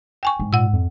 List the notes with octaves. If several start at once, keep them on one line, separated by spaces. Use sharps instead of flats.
G5 G#5 C#6
G#2
A#2 F#5 E6
F2